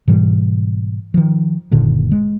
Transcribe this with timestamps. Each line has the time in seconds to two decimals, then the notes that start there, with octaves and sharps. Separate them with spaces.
0.08 G#2 B2 E3 G3
1.14 D#3 F3
1.71 F#1 A#2 D3 D#3
2.12 G#3